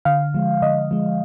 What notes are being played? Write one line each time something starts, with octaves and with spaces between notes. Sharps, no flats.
D3 F5
F3 G#3
D3 D#5
F3 G#3